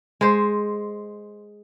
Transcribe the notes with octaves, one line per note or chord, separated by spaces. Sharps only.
G#3 C5